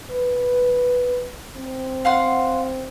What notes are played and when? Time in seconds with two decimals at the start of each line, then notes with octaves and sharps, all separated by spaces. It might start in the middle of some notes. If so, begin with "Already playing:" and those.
0.11 B4
1.57 C4
2.05 F5 F#5 C6